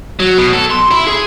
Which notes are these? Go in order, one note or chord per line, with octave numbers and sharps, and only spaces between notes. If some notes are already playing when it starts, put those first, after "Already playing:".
F#3
B2
A4
C6
E4
G#4